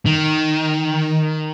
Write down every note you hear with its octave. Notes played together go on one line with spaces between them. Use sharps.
D#3